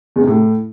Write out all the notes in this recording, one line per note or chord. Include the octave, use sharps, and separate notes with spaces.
E2
C3
A2